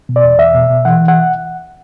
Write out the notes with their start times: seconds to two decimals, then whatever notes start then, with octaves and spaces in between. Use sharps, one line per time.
0.09 B2
0.16 D5
0.24 E2
0.39 E2 E5
0.55 B2
0.70 B2
0.85 E3 F#5
1.00 E3
1.08 F#5